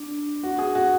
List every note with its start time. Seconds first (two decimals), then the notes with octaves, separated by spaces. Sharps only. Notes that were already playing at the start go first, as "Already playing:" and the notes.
Already playing: D4
0.43 F#4
0.59 G#4
0.75 F#4